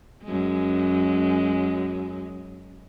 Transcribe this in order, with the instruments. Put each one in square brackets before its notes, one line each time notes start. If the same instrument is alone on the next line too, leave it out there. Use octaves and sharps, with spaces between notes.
[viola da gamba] F#2 G#3